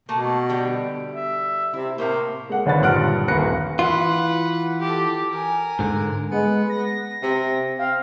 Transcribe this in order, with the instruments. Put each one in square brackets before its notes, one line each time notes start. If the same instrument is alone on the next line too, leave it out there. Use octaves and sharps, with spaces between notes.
[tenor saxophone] B2 [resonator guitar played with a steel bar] A3 A#3
[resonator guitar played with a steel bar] D3 G3 G4
[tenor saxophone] E5
[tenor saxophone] C3 [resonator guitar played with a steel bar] E4
[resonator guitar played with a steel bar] A2 C3 E5 [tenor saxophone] A#3
[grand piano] G#3 F#5
G#1 D3 D4 B4 C#5 A6
G2 A#2 F#5 F6 F#6 D7
D#1 A#3 B4 F#6 A#6 C#7
[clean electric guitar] E3 F4 [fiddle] B4 F#5
[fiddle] G4 A4
A#4 G#5
[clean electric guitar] G#2 D3
[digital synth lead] G#3 [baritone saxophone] B3
[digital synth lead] A#6
[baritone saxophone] C3
[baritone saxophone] C4 [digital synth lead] F5